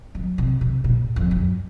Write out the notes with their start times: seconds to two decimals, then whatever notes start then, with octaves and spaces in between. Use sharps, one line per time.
0.15 F#3
0.38 C3
0.61 C3
0.84 A#2
1.16 F2
1.31 F#2